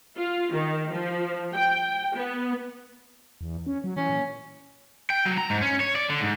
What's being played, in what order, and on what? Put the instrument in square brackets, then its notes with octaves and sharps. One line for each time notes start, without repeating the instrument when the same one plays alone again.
[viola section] F4
D#3
F3
G5
B3
[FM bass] E2
C#4
F#3
[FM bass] E3 [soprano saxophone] C#4
[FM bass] A#2
[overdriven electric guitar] G5
F#3
A#5
G#2
C#4
C#5
D5
D3
G#2